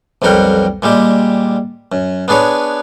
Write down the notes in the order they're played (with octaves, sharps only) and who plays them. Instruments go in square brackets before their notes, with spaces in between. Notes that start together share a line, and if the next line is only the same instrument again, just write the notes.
[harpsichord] B1 F2 G3 A#4 F#5 G5
A#2 G3 G#3 G4
F#2
B3 D4 G#4 B4 C#5